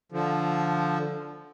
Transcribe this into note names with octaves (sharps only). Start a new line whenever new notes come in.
D3 F3